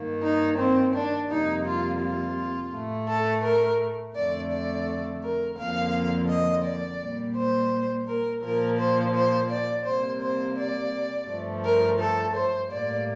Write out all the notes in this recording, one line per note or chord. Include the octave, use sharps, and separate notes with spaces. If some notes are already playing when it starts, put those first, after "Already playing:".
Already playing: G2 D#3 A#3
D#4
C4
D4
F2 C3 G3 A#3 D#4
F4
F4
A2 A3
A4
A#4
F2 D3 A3 D5
D5
A#4
F2 D3 F3 A#3 F5
D#5
D5
A#2 G3 A#3
C5
A#4
A#2 F3 A#3 A#4
C5
C5
D5
C3 G3 A#3 C5
C5
D5
G2 F3 A3
A#4
A4
C5
A2 G3 A#3 D5